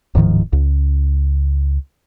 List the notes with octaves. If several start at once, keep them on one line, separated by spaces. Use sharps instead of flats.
D1 G#2 D#3 F3
C#2